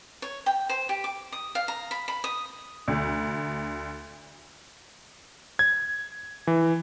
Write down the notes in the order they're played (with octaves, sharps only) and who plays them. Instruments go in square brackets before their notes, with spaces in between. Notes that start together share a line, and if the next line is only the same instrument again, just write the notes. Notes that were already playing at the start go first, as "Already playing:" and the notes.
[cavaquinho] C#5
G5
C5
G4
D6
D#6
F5
A#5
B5
B5
D#6
[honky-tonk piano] D2
[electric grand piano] G#6
E3